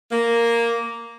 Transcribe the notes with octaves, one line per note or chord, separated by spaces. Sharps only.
A#3